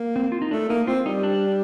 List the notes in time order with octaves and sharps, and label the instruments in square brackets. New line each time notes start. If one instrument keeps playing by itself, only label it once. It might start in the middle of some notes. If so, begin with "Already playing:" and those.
Already playing: [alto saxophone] A#3
[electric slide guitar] C4
F4
D#4
[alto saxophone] A3 [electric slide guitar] D4
[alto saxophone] A#3 [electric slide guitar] D#4
[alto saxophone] C4 [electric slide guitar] F4
[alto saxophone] G3 [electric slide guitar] D#4
[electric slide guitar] D4